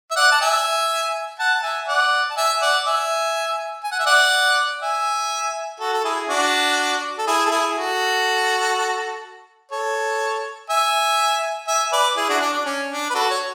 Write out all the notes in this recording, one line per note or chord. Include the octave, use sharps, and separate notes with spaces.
E5
D5 F#5
A5
E5 G#5
F#5 A5
A5
E5 G#5
D5 F#5
A5
E5 G#5
D5 F#5
E5 G#5
G#5
F#5
E5
D5 F#5
E5 G#5
F#4 A4
A4
E4 G#4
D4 F#4
A4
E4 G#4
A4
E4 G#4
F#4 A4
A4 C#5
E5 G#5
E5 G#5
B4 D5
E4 G#4
D4 F#4
D4
D4
C#4
D4
B4
F#4 A4
C#5